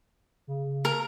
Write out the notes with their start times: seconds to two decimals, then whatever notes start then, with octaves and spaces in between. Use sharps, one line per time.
0.47 C#3
0.85 A#4